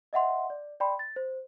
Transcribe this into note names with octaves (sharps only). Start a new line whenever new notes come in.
D#5 E5 F#5 C6
D5
D5 G5 B5 C6
A6
C5